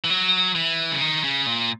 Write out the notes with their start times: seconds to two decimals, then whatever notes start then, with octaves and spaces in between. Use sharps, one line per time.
0.05 E3
0.10 F#3
0.55 E3
0.92 C#3
1.01 D#3
1.24 C#3
1.46 A#2